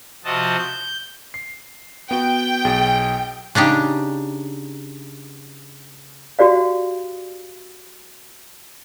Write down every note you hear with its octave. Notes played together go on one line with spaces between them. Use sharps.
C3 F3 C4 F#4 D#5 A5
G6
C7
B3 F#4 G5
B1 G#4 A6
C#3 D4 D#4 G4
F#4 G4 D5 F5